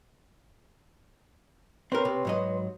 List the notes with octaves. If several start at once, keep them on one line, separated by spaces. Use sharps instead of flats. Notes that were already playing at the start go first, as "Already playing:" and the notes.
C4 A#4 B4 C#5 C6
C3
G#2 F#3 D#5